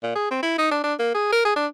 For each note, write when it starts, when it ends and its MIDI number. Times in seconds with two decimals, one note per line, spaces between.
0.03 0.12 46
0.15 0.29 68
0.31 0.40 60
0.42 0.56 64
0.58 0.70 63
0.71 0.79 62
0.83 0.94 62
0.99 1.10 58
1.14 1.29 68
1.32 1.41 70
1.45 1.54 68
1.56 1.66 62